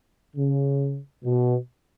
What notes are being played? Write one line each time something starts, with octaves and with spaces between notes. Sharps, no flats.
C#3
B2